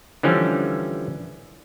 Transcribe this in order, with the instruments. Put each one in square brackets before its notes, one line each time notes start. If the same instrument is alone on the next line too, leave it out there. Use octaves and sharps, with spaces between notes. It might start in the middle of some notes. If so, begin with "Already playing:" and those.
[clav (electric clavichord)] D3 E3 F3 G3 C#4